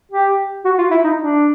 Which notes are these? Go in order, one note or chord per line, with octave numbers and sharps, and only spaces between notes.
G4
F#4
F4
E4
D#4
D4